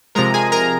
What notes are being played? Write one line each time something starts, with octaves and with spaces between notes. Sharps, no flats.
C3 F3 G#3 A#4 A#5
G#4 G#5
A#4 A#5